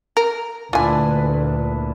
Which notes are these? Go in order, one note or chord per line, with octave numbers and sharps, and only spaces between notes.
A#4
D2 A#2 D4 E4 F4 B4 G#5